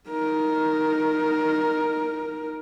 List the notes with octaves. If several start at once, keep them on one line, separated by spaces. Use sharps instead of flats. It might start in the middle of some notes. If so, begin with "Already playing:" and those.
D#4 A#4